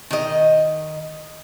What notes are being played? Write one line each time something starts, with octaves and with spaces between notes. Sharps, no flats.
D#3 D#5